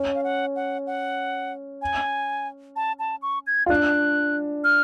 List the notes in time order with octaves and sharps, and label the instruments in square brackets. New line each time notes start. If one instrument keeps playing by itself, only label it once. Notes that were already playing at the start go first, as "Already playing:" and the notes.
Already playing: [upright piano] C#4
[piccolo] F5
F#5
F#5
F#5
G#5
A5
A5
C#6
G#6
[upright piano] F4
[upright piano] D4 [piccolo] F#6
[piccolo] F6